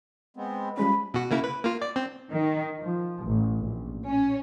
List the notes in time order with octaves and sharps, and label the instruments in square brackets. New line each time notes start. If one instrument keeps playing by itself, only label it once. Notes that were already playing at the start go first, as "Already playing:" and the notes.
[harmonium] G#3 B3 C4
[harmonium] F3 [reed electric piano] G3 G#3 C#4 [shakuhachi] B5
[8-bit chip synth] B2 F#4
C#3 A#3 E4
B4
A#3 F4
D5
C4
[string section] D#3
F3
A1
A#1
C#4